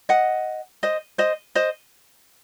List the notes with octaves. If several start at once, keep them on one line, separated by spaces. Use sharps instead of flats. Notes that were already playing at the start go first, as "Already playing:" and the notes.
D#5 F#5
C5 D#5
C5 D#5
C5 D#5